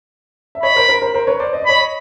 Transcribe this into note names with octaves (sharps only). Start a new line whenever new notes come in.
E5
C#5 D#5 B5
A#4 C5
A#4 C5
A#4 C5
A#4 C5
B4 C#5
C5 D5
D#5
D5
C#5 D#5 B5